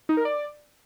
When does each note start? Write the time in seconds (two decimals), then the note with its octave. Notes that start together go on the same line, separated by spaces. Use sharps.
0.09 D#4
0.17 A#4
0.25 D5